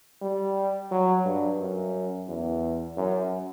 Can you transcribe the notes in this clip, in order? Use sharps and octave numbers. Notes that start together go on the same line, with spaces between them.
G3
F#3
G2
F#2
E2
F#2